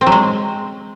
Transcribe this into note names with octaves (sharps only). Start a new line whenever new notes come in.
C4
F#3
G#3